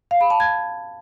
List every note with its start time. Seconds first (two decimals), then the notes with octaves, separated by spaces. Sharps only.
0.11 F5
0.21 B5
0.30 A5
0.40 G#6